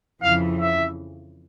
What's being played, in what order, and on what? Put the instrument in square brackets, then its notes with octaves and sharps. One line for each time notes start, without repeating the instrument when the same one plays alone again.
[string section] F2 C#3 E3 [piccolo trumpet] F5
[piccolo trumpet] E5